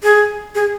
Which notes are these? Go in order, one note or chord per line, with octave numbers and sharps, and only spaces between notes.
G#4
G#4